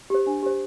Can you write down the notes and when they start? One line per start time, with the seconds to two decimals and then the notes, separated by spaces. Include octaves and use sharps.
0.10 G4 C5
0.27 D4
0.43 G4 C5